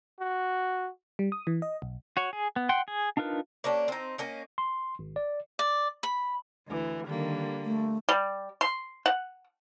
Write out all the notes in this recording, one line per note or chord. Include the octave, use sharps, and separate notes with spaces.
F#4
G3
D#6
E3
D#5
B1
F#4 C#5
G#4
B3
F#5 G5 C6
G#4
D4 D#4 F4 A#4 B4
A#3 C#4 D4 G4
C4 D#4
A#3 C#4 D#4
C6
G#1
D5
D5
B5
D2 E3
D3 D#3 G3 A#3
A3
G3
C6
F#5